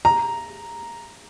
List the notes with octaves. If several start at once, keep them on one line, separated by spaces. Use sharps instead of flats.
A#5